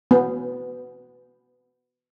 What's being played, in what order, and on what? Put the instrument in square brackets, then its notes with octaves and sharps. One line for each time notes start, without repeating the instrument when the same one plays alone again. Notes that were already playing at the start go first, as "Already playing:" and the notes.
[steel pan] B3